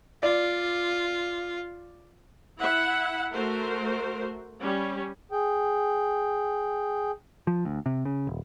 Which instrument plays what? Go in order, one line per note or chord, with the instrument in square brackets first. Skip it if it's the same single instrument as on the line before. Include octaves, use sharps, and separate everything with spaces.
[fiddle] F4 [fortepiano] D5
[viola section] E4 E5 F#5
A3 F#4 A#4 C5
G3 C#4
[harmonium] G#4 G5
[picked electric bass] F3
D2
C3
C#3
D#1